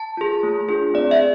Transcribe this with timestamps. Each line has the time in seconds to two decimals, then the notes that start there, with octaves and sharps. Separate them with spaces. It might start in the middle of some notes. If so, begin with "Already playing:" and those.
Already playing: A5
0.17 F4 G#4
0.43 A3
0.69 D4 F4 G#4
0.94 C4 D5
1.11 E5
1.19 G#4